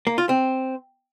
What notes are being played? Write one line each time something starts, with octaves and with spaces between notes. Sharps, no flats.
A#3
F4
C4